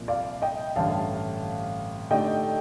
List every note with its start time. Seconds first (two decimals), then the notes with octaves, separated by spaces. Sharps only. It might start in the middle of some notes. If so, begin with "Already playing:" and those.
Already playing: C2 A#2 F3
0.08 D5 F5
0.42 D#5 G5
0.76 A1 G2 D3 F5 A5
2.11 D3 A3 D#4 G4 D5 D#5 G5